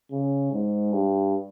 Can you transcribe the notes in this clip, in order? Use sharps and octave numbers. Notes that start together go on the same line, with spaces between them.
C#3
G#2
G2